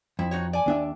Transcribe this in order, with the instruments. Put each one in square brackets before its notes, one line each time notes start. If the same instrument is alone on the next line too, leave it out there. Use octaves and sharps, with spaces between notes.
[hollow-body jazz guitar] F2 [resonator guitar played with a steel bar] E4
[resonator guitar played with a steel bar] D#4 F#4 C#5
D5 G#5
[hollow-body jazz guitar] D#2 D4 E5